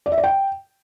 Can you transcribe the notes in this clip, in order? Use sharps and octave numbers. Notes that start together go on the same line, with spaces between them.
D5
E5
D5
G5